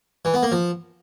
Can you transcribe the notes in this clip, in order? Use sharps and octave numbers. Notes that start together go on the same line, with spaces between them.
E3
B3
A#3
F3